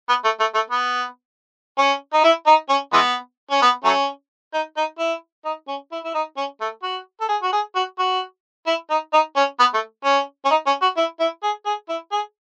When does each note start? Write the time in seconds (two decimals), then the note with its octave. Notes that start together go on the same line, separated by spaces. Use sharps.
0.09 B3
0.24 A3
0.40 A3
0.55 A3
0.70 B3
1.78 C#4
2.13 D#4
2.24 E4
2.47 D#4
2.69 C#4
2.93 E3 G#3 B3
3.51 C#4
3.62 B3
3.84 F#3 A3 C#4
4.54 D#4
4.77 D#4
4.99 E4
5.45 D#4
5.68 C#4
5.92 E4
6.04 E4
6.15 D#4
6.37 C#4
6.61 A3
6.83 F#4
7.21 A4
7.29 G#4
7.43 F#4
7.53 G#4
7.75 F#4
7.99 F#4
8.67 E4
8.90 D#4
9.13 D#4
9.36 C#4
9.60 B3
9.74 A3
10.05 C#4
10.45 C#4
10.50 D#4
10.67 C#4
10.82 F#4
10.97 E4
11.20 E4
11.43 G#4
11.66 G#4
11.89 E4
12.12 G#4